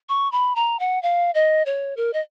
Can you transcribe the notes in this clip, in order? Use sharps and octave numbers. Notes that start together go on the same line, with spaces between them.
C#6
B5
A#5
F#5
F5
D#5
C#5
A#4
D#5